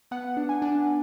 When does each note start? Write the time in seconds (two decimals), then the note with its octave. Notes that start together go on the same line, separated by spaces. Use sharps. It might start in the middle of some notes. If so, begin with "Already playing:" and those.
0.11 B3 F#5
0.37 D4
0.49 G#5
0.62 D4